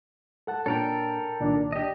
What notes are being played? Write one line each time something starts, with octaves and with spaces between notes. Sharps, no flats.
A4 F#5 A5
A#2 D4 A4 A#4 C#5 G5
C2 A#2 D#3 D4
G4 D#5